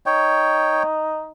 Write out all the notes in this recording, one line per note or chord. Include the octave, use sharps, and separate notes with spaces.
D#4 C#5 G5